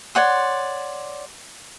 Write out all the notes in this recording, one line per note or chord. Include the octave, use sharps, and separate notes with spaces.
C#5 D5 F#5 C6